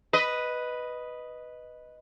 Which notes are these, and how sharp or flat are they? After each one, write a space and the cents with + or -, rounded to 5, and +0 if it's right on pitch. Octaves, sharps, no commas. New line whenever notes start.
B4 +0 D#5 +0